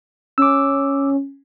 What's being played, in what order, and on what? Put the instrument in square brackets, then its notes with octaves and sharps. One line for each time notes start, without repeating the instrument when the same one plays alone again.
[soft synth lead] C#4 [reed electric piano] D6 E6